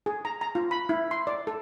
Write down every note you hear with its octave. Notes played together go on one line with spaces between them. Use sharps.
G#4
A#5
A#5
F4
B5
E4
C6
D5
A4